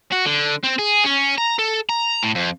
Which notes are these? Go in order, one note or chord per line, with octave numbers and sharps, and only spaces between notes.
F#4
D3
C4
G#4
C#4
A#5
A4
A#5
A2
F2